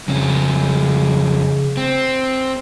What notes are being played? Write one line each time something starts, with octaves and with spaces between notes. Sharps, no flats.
F2 C#3 C#4
C4